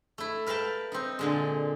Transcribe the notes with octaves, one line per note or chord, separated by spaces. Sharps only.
A3 E4
A#4 B4 F5 G5 A5
C4 D#4
A#2 D3 G#3